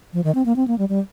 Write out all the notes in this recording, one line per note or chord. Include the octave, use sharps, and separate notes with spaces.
F3
D#3
C4
A#3
C4
A#3
G3
G3